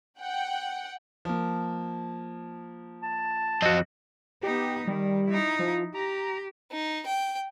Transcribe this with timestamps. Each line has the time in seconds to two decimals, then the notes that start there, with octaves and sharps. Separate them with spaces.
0.21 F#5 G5
1.25 F3 A#3
3.03 A5
3.62 F2 C4 F#4 D#5
4.43 B3 D#4 G4
4.87 D#3 G3
5.26 D#4 E4
5.59 F3
5.94 G4 A#5
6.71 D#4
7.06 G5